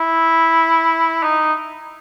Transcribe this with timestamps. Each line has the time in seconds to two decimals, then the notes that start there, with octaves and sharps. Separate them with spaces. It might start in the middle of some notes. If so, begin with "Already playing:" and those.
Already playing: E4
1.23 D#4